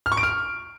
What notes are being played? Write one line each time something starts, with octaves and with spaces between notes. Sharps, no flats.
F6
C#6
D7
F6